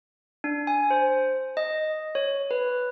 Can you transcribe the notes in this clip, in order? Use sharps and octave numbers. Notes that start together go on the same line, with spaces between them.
D4
G#5
C5
D#5
C#5
B4